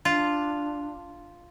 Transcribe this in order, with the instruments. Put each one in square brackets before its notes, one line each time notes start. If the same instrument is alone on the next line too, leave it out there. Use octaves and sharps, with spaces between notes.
[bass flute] D4 [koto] F4